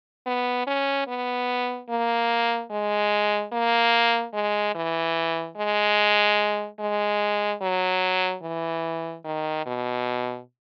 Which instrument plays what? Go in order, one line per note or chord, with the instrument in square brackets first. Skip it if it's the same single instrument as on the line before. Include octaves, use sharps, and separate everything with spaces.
[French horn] B3
C#4
B3
A#3
G#3
A#3
G#3
E3
G#3
G#3
F#3
E3
D#3
B2